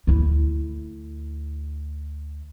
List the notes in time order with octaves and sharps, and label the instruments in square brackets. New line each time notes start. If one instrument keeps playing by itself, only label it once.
[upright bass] D2 E4